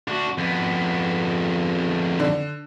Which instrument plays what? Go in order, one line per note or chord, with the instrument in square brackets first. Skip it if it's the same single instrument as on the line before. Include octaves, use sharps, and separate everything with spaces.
[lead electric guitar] D4 F#4
F2 B3
[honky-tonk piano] D3